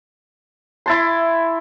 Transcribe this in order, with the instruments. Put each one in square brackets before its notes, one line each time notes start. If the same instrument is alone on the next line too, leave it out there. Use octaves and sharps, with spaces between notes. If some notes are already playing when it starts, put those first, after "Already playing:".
[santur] E4 A5 C6